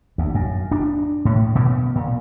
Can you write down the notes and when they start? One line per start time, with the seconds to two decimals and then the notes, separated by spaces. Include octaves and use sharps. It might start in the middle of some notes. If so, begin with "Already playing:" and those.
0.18 D2
0.35 F#2
0.71 D4
1.25 A2
1.55 B2
1.95 A#2